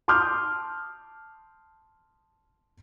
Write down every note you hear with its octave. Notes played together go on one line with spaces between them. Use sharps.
A5 C6 D6 D#6 F6 G6